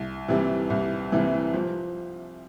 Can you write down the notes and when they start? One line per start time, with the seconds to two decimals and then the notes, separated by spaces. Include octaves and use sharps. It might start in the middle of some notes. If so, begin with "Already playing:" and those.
Already playing: C2
0.28 C3 E3 G3
0.70 C2
1.12 C3 E3 G3
1.54 F3